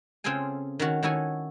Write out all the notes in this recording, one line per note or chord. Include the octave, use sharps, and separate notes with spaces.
C#3 C4 F4 G#4 A4 G#5
D#3 C#4 F#4
D#3 E4 F#4 A4 C#5 G#5